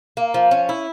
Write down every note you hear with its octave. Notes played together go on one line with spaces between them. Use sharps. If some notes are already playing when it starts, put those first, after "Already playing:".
A#3
F3
C#4
E4